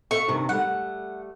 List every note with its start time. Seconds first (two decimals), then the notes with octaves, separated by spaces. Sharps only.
0.11 A4 E5 F5 C#6
0.28 G2 C3 D#3
0.49 G3 A3 F#5